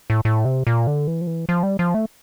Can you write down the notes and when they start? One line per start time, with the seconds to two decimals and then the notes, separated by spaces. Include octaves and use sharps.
0.10 A2
0.25 A2
0.45 C3
0.67 A#2
0.87 D3
1.07 E3
1.21 F3
1.27 E3
1.49 F3
1.63 G3
1.79 F3
1.94 A3